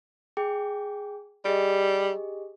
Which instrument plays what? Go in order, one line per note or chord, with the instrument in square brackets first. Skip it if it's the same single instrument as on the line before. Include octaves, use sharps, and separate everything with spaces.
[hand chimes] G#4 G5 D6
[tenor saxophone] G3 [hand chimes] G4 G#4 D#5